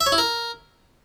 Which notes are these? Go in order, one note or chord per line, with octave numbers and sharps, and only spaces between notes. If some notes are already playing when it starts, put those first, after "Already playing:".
E5
C#5
E4
A#4